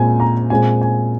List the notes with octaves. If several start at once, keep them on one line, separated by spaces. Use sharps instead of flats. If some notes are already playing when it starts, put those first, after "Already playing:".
Already playing: A#2 G#3 C4 G#5
A#5
A#2 G#3 C4 G#5
G#5